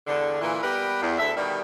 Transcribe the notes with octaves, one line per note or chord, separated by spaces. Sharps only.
E2 G2 D3
A#2 E3
G3 B3 G4 A#4 B4
E2
D2 A4 E5
B2 D#3 G3